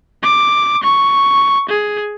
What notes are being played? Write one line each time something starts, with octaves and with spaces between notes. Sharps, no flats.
D6
C#6
G#4